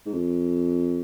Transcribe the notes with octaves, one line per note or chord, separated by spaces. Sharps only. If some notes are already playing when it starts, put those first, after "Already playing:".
G#2
F2